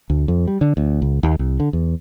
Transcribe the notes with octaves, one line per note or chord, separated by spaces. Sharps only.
D2
F2
G3
D3
D2
C#2
D#2
C2
D3
E2